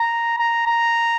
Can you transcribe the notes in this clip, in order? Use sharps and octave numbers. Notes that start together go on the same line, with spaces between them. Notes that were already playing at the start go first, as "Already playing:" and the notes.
Already playing: A#5
A#5
A#5